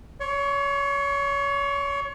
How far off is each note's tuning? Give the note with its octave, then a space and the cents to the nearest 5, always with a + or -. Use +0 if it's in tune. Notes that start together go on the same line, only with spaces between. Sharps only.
C#5 +30 C#6 -35